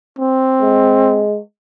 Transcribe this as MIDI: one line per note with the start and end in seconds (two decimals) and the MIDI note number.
0.19 1.25 60
0.62 1.39 56